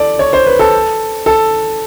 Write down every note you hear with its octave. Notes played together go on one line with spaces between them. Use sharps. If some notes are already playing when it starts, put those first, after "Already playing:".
Already playing: A4 D5
C#5
C5
B4
A4
A4